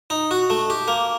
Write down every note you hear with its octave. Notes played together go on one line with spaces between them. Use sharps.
D#4
F#4
A3
G4
A#3